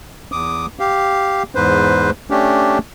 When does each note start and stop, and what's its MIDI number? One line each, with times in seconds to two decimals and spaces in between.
0.32 0.66 40
0.32 0.66 86
0.32 0.66 87
0.79 1.43 67
0.79 1.43 77
1.55 2.10 40
1.55 2.10 44
1.55 2.10 71
1.55 2.10 72
2.30 2.78 57
2.30 2.78 61
2.30 2.78 62
2.30 2.78 67